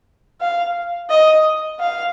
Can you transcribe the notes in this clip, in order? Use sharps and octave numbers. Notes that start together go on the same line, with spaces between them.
F5
D#5
F5